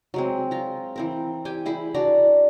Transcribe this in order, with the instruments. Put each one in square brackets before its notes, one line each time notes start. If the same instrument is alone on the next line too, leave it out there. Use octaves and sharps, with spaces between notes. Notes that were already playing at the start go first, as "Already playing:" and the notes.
[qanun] F#3 G#3 C4
F4 A#5
E3 C4 A#4
G4 G5 G#5
E4 G#4 B5
D4 F#4 D5 A#5